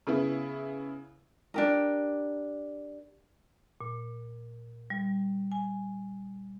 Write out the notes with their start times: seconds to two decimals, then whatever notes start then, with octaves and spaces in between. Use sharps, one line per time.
0.07 C#3 B3 E4
1.54 D4 G4 A#4
3.81 A#2
4.90 G3
5.52 G#5